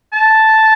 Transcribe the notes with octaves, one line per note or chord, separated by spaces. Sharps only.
A5